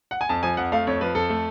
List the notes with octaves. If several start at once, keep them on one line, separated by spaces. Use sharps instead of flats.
F#5
G#5
F2 A5
F3 G#5
F2 F#5
A3 F5
F2 C#5
F3 B4
F2 A4
A3